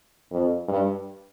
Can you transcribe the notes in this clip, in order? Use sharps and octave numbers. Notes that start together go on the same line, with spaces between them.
F2
G2